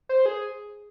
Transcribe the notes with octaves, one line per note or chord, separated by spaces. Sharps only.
C5
G#4